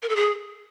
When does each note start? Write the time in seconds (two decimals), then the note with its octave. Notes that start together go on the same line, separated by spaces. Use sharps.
0.02 A#4
0.09 A4
0.16 G#4